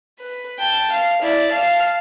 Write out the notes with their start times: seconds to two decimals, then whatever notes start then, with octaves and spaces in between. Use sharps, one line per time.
0.19 B4
0.58 G5 A5
0.92 F5
1.21 E4 D5
1.51 F5 A5